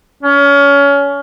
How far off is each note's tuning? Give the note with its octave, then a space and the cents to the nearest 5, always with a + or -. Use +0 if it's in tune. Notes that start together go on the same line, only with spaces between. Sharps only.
C#4 +25